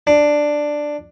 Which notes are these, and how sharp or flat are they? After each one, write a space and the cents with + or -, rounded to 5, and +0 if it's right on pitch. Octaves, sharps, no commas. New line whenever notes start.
D4 +5